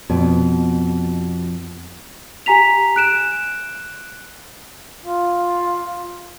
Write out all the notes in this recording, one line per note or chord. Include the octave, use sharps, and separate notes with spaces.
F2 B2
G4 G#5 A#5 B6 F7
F#6 D7 E7
F4